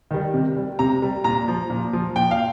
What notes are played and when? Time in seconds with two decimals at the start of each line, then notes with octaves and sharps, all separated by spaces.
0.11 D#3 G3
0.34 C3
0.56 G3
0.79 C3 A#5
1.02 G3
1.24 A#2 A#5
1.48 F3
1.70 A#2
1.93 F3
2.16 A#2 G5
2.31 F5